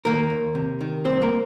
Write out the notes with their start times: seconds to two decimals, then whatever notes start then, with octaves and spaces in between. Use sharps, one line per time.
0.05 D#3 A#3 A#4
0.30 D#2
0.55 C3
0.81 D#3
1.05 C2 C4 C5
1.22 A#3 A#4